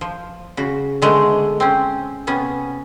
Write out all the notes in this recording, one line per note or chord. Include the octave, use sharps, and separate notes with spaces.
F3
C#3 F#4
D3 G#3 A3 B3
C4 C#4
C3 B3 C#4